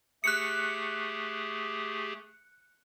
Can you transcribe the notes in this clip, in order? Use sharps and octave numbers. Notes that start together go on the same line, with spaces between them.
A3 G4 G#4 F#6 C#7